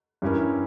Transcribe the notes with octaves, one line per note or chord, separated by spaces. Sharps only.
G2 G3 C#4 E4 A#4